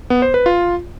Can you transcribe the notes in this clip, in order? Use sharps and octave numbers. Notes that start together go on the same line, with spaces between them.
B3
C5
B4
F4